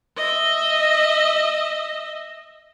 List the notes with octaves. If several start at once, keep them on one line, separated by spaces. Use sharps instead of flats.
D#5 E5